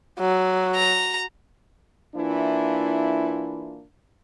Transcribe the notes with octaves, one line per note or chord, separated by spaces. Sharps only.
F#3
A#5
E3 A#3 D4 E4 F4